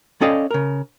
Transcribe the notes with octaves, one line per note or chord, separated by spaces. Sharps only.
C#4 A4 D5 D#5 F5 G5
C#3 A#4